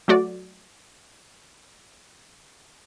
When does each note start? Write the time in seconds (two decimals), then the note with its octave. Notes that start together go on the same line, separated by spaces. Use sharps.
0.08 F#3 A3 F#4 D5